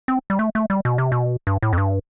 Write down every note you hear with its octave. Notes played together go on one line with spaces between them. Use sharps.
C4
G3
A3
A3
G3
B2
C3
B2
G2
A2
F2
G2